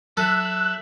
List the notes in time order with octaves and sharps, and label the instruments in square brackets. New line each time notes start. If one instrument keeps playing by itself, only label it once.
[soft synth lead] F#3 [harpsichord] A4 [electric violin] E5 [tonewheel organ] F#6